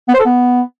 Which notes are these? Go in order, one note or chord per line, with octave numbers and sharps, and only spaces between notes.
B3
C5
A4
B3